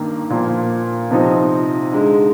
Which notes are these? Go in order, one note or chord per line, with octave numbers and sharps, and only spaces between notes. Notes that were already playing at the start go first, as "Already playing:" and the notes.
Already playing: G2 D#3 A#3
A#2 F3 A#3
C3 F3 C4 D#4
D3 G#3 D#4